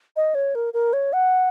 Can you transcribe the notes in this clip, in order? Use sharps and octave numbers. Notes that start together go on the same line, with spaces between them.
D#5
C#5
A#4
A#4
C#5
F#5